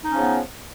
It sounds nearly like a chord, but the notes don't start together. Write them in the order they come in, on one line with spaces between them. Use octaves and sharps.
D#4 C#4 F3 C#3 B3